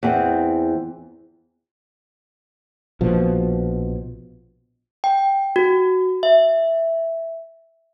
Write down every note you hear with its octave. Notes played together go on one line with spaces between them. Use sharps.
E2 C4
A#1 B2 F3
G5
F#4
E5